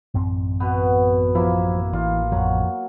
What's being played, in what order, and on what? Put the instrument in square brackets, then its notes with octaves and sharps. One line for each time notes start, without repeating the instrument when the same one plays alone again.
[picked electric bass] A1 F#2 C4
[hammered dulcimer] B2 B3
[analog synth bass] F3 [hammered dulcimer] A#3 E4
[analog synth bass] A1 [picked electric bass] E3 [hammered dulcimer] F4
[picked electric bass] F2 F3 [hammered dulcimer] F#3